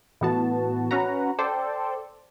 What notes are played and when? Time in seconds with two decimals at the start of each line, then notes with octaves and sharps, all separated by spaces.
0.21 A2 E3 B3 F#4 A5
0.91 C#4 F#4 B4 F#5 A#5
1.39 A4 C5 D5 G5